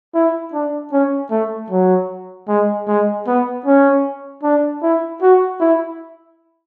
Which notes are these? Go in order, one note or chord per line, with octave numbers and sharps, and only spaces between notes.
E4
D4
C#4
A3
F#3
G#3
G#3
B3
C#4
D4
E4
F#4
E4